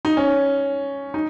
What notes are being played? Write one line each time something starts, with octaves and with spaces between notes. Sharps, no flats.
D#4
C#4
D#4